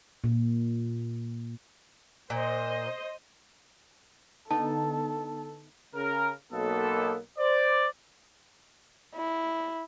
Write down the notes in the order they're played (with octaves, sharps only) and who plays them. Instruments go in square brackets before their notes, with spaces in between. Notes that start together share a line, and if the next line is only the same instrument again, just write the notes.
[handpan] A#2
[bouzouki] A#2 [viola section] C5 D#5
[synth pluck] D3 B3 D#4 [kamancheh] A4 [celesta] A5
[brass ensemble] C#3 A#4
B1 A#3 B3 A4
C5 D5
[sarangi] E4